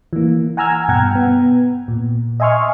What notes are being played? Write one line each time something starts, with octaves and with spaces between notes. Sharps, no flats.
E3 A#3
F#5 G#5 A#5 E6 F6 G#6
G2 B2 F#5 G5 A#5 G#6
B3
A#2
D#5 E5 G#5 C6 C#6 F6